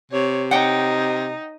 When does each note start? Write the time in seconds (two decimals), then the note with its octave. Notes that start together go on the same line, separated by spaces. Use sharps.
0.12 C3 C#5
0.51 D#4 F#5 G5